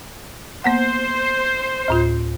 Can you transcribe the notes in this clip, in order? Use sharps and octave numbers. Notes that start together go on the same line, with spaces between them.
A#3 B3 C5 F#5
D2 A2 F4